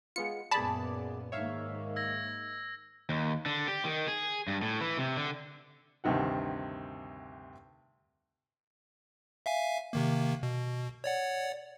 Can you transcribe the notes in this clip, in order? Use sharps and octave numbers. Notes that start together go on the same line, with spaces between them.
G#3 B3 F4 C#7
F#2 A#2 B3 G#4 D5 A5 B5
G#2 D#3 A#3 C#5 E5 F5
E6 G#6 A#6
D#2
D3
G4
D#3
G#4
G2
A2
E3
C3
D3
D2 G2 C3 D#3 F#5
E5 F5 G#5
C3 D#3 A#3
B2
C#5 D5 F#5